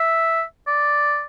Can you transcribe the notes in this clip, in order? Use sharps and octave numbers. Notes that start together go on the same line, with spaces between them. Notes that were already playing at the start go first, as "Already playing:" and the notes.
Already playing: E5
D5